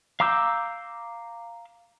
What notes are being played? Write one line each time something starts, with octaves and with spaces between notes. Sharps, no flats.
F5 A#5 D6 E6 G6